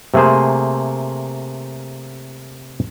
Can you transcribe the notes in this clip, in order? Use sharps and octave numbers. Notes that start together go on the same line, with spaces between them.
C3 A3 A#3 G#4 C5